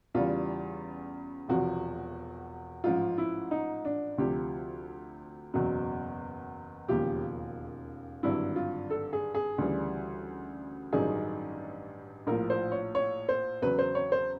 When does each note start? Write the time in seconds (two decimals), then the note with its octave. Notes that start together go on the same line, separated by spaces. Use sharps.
0.14 E2 C#3 E3 G3 F4
1.48 E1 E2 C3 F3 F#4
2.84 A1 G#2 F3 F4
3.18 E4
3.51 D#4
3.85 D4
4.18 D2 C3 F3 G4
5.54 F#1 E2 B2 F#3
6.88 E1 D#2 C#3 F3 G4
8.23 G#1 G2 D3 F#3 E4
8.56 F4
8.90 A4
9.13 G#4
9.35 G#4
9.58 D2 C#3 E3 G3
10.93 A1 G2 D#3 F#3 G#4
12.27 A#1 A2 F3 A#4
12.50 C5
12.72 C#5
12.95 C#5
13.29 C5
13.62 E2 C#3 F#3 B4
13.79 C5
13.95 C#5
14.12 C5